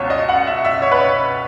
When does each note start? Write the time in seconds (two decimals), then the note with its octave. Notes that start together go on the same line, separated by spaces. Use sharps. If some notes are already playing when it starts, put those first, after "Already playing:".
Already playing: C#2 B2 C#5
0.10 D#5
0.29 F#5
0.47 E5
0.65 E5
0.82 C#5
0.91 B4
1.01 C#5